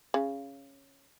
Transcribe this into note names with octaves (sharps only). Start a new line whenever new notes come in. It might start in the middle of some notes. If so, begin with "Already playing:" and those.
C#3